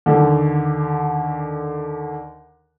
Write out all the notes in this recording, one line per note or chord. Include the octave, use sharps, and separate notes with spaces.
D#2 D3